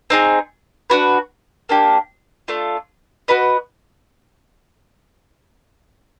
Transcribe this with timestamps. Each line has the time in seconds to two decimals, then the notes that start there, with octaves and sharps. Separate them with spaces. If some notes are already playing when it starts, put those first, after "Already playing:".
0.10 C4 D#4 G#4
0.90 D4 F#4 B4
1.69 A#3 D4 G4
2.48 A3 D4 F4
3.28 F#4 B4 D#5